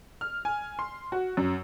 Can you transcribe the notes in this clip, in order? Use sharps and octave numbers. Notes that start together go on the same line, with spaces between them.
F6
G#5
C6
F#4
F#2